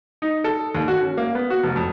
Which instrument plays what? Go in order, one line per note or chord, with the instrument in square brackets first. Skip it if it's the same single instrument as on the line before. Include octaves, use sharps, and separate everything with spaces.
[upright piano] D#4
A4
D#2
F#4
C#4
A#3
B3
F#4
F1
F2